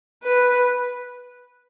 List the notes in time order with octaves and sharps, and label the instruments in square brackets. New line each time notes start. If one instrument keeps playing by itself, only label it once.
[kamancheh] B4